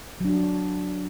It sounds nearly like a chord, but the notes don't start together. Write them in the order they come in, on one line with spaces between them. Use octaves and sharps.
F#3 D4 F#4